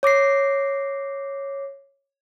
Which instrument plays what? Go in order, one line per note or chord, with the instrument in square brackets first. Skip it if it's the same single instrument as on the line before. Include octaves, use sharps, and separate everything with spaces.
[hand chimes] C#5 D6 A#6 C7